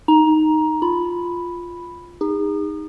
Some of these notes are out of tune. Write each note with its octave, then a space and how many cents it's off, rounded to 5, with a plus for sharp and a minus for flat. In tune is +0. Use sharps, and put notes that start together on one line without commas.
D#4 +0 A#5 +15
F4 +0 B5 +0
D#4 +0 G#4 -40